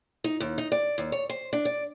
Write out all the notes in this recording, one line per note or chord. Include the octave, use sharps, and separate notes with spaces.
D#4
D#2
D#4
D5
D#2
C#5
C5
D4
D5